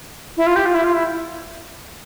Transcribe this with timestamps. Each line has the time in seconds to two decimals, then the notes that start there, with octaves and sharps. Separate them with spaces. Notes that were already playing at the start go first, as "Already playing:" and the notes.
0.37 E4
0.47 F4
0.56 G4
0.66 F4
0.74 E4
0.84 F4
0.93 E4